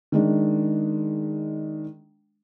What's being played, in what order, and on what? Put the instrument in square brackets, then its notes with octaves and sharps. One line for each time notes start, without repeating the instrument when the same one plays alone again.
[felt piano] D#3 G#3 D4